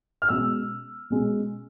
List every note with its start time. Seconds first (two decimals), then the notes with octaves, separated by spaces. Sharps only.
0.22 F6
0.29 B2 G#3 C#4 E6
1.10 B2 G#3 C#4